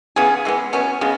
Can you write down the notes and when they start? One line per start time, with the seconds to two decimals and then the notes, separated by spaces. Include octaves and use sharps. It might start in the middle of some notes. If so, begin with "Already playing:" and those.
0.16 C#3 E3 B3 G#4
0.45 E3 G#3 B3
0.73 B2 B3 C#4
1.01 C#3 G#3 B3